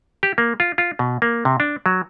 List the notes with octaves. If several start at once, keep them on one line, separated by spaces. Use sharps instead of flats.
G4
A#3
F4
F4
B2
A#3
C3
D4
F#3